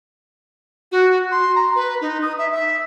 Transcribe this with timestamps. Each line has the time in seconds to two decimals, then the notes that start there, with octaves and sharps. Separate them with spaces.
0.91 F#4
1.31 C6
1.55 A#5
1.75 B4
2.01 D#4
2.22 D#6
2.38 E5
2.52 E5